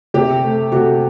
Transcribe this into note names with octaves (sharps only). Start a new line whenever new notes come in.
C3 G4
A3
C3 F#4 A4